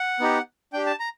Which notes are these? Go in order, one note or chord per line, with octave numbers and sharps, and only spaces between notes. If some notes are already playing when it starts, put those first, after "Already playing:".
Already playing: F#5
B3 D#4 G4
D4 G4 G5
A5
A#5